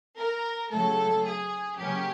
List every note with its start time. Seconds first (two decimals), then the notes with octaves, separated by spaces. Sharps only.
0.18 A#4
0.70 C#3 F#3 A3 A4
1.24 G#4
1.77 C#3 F#3 A#3 C#4 G4